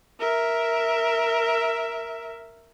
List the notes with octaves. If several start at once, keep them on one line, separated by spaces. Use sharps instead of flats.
A#4 E5